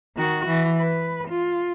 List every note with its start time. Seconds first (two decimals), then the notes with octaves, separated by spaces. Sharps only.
0.17 D#3 F#4
0.47 E3
0.78 B4
1.28 F4